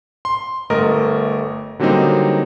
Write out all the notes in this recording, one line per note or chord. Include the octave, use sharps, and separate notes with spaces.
C6
G1 A3 A#4 D#5
D3 F#3 G3 A#3 C4 D#4